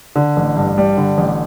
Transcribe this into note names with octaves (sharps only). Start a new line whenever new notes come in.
D3
A1
G2
G3
D3
A1